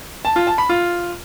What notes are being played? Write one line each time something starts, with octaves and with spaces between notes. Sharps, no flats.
A5
F4
A5
B5
F4